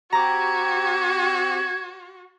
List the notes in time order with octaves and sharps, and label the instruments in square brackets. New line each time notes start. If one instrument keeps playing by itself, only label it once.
[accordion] C4 G4 [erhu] F#4 [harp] A#5 D6 [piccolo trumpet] G#6